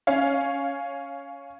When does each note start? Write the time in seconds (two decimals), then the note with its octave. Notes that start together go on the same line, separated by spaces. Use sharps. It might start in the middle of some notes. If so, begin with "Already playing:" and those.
0.07 C#4 C#5 F5